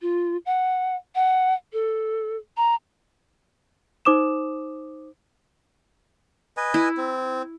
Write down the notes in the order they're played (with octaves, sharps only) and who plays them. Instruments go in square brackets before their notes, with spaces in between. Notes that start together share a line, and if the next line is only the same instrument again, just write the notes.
[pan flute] F4
F#5
F#5
A4
A#5
[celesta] D#4 C5 D6 D#6 E7
[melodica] B4 D#5 G#5
[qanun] E4
[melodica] C4